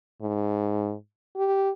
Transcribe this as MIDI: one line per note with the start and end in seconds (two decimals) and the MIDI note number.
0.22 0.94 44
1.36 1.70 67